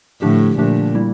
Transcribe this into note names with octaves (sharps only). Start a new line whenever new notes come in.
A2 D3 F3 A3 D4 G4
A#2 D3 F3 A3 D4 G4
G3 A#3 E4